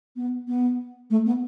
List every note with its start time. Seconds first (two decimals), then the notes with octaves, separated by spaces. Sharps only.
0.16 B3
0.47 B3
1.10 A3
1.26 B3